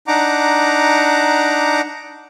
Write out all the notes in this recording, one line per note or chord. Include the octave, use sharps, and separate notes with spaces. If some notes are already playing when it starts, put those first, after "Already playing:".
D4 D#4 F#5 A#5 D6